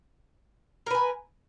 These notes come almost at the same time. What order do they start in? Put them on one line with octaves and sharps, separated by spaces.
A#4 B4 G#5